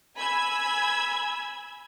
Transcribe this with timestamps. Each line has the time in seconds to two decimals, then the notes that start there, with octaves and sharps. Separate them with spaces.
0.16 G#5 B5 E6 G#6